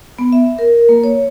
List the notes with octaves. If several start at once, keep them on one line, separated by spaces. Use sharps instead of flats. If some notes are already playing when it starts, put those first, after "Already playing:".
B3
E5
A#4
A#3
C#5